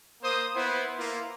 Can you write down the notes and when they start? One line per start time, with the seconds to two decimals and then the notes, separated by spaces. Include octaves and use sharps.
0.23 A#3 C5 D#6
0.55 B3 E4 B4 C5
0.98 A#3 E4 F4